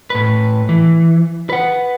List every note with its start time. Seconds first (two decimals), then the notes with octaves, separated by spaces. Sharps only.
0.10 A2 B4
0.69 E3
1.49 B4 F#5